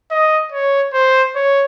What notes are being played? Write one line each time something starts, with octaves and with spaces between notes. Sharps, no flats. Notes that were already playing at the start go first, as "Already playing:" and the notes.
D#5
C#5
C5
C#5